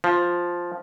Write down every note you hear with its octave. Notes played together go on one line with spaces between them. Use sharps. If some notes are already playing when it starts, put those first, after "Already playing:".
F3